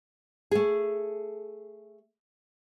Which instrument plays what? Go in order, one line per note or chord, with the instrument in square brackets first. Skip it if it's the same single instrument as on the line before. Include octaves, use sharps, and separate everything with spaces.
[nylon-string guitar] A3 G#4